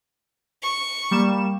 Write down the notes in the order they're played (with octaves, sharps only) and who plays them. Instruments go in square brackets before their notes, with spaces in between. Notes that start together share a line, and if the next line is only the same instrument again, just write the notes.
[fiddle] C#6
[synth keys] G3 A#3 E7